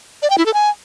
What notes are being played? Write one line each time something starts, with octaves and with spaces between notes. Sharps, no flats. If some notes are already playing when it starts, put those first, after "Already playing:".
D5
G5
E4
A4
G#5